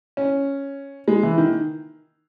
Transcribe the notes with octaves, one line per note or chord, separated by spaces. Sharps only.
C#4
G#3
E3
D#3